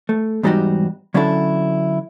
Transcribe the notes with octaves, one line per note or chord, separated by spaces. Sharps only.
A3
E2 G#2 G3 D#4 F#4 G4
D3 F#3 C#4 D4 E4 A4